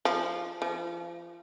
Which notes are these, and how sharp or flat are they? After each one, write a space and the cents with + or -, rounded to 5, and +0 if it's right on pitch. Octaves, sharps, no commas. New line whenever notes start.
F3 -10
F3 -30